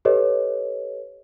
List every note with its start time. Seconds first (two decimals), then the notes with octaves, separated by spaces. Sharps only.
0.05 G4 A4 B4 C#5 D#5